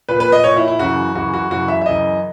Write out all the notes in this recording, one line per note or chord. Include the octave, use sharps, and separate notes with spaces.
A#2 B4
B4
D#5
A#2 C#5
E4
E4
F#2 C#3 E3 F#4
F#2 C#3 E3 F#4
F#4
F#2 C#3 E3 F#4
E5
E5
F#2 C#3 E3 D#5